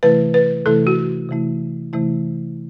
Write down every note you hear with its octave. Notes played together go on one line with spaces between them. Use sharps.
C3 E3 A3 E4 B4
B4
C3 E3 A3 E4 A4
F#4
C3 E3 A3 E4
C3 E3 A3 E4